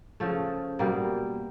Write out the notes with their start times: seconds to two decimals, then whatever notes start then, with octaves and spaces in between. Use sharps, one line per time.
0.20 C#3 F3 A3
0.79 B2 G3 A#3